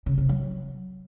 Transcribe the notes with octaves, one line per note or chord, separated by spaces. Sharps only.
C#3
C3
F#3